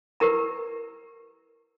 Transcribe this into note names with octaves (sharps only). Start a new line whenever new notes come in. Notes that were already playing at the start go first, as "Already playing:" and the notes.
E4 G4 A#4 B4 A#5